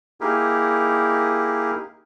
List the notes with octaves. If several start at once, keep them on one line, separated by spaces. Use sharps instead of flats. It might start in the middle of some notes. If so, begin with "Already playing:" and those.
A#3 D#4 E4 G4 G#4 A#4